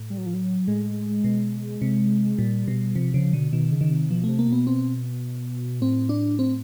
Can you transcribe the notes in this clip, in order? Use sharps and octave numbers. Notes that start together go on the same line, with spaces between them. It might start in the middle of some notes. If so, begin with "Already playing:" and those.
Already playing: A2
G3
F#3
F3
F#3
A2 G#3
B2
C3
A#2 G3
B2
C3 F3
C#3 F3
B2 D3
B2 D#3
C#3
D#3
C3
B2 F3
C3 A3
A#3
B2 B3
C4
A2 C4
D4
C4